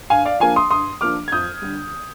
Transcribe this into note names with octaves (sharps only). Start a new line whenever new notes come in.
G2 F5 G#5
D5 F5
F3 A#3 D4 F5 G#5
C6 D#6
G2 C6 D#6
F3 A#3 D4 D6 F6
G#6
F2 D#6 G6
D3 G3